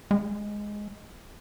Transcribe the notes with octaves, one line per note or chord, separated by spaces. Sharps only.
G#3